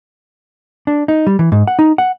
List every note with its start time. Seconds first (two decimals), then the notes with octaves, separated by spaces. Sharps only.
0.87 D4
1.08 D#4
1.27 G3
1.39 E3
1.52 G#2
1.67 F#5
1.79 D#4
1.98 F#5